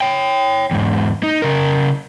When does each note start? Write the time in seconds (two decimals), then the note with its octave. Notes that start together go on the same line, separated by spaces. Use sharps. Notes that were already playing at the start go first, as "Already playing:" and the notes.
0.01 C#5 G5
0.71 E2 G#2
1.23 D#4
1.42 C#3 A#4